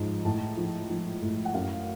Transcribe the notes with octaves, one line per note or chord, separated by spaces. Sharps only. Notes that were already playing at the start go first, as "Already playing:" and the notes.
Already playing: G#2 F3
A2 A5
F3
F3
A2
F#5
F#2 F5